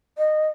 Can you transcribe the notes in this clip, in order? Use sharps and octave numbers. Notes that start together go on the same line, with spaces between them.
D#5